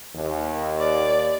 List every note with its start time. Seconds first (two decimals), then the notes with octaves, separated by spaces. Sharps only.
0.14 D#2
0.79 D5